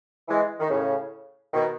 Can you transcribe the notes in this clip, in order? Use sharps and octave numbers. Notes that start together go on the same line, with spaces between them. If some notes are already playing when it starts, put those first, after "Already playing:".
E3 G#3
D#3
A2 C#3
B2 D#3